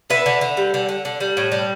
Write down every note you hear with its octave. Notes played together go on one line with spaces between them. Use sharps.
D3 B4 E5
D3
D3
G3
D3
D3
D3
G3
A2
G3